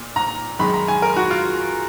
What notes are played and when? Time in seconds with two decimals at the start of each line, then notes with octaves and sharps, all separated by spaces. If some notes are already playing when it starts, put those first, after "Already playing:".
Already playing: A#2
0.16 A#5
0.59 F#2 D#3 G#3 B5
0.74 A#5
0.88 G#5
1.02 A#4
1.16 F#4
1.31 F4